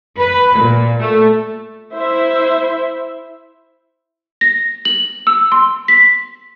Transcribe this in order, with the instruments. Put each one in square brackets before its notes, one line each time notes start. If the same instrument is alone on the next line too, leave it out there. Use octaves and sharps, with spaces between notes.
[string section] B4
A#2
A3
[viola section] E4 C5 E5
[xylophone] A#6
F#7
E6
C6
B6